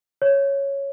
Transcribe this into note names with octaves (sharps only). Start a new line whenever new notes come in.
C#5